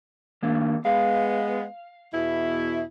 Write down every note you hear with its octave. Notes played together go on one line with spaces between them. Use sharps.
D#3 A#3 D4
G#3 B3 F5
E2 B2 E4